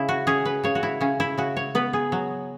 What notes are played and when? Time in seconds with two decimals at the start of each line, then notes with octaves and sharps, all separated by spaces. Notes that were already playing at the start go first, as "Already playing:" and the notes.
Already playing: C#3 E4
0.09 F#4
0.27 C#4 G#4
0.45 B4
0.64 C#3 C#5
0.75 F#4
0.83 E4
1.01 C#3 C#4
1.20 E4
1.38 C#3 F#4
1.57 C#5
1.75 B3 B4
1.93 G#4
2.12 F#3